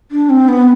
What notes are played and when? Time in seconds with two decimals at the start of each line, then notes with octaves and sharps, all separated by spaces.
0.11 D4
0.30 C4
0.48 B3